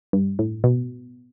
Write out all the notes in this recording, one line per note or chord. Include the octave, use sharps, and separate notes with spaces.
G2
A2
B2